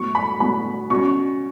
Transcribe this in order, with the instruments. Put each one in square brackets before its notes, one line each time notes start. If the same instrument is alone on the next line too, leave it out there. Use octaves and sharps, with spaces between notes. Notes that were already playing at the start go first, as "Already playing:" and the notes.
Already playing: [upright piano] A2 F#3 B3 C#6
B5
A2 F#3 B3 B5
B2 F#3 C#4 C#6